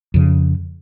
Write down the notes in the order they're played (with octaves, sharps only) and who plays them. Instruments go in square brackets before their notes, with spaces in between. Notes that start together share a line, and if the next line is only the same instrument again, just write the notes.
[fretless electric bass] F2 C#3